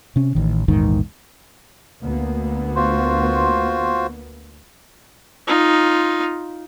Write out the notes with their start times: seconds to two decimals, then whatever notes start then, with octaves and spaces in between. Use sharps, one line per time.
0.16 C3 C#4
0.35 A1 D#3
0.68 A#1 E2 G#2 D#3
2.01 D2 A#3 B3
2.76 F4 F#4 C5
5.48 D#4 F4